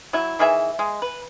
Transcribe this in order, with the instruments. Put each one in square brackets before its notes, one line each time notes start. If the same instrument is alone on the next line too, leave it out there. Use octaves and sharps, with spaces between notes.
[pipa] F#3 E4
D#3 E3 G#4 E5
G#3
B4